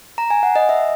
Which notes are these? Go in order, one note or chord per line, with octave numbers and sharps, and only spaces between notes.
A#5
G#5
F#5
D#5
E5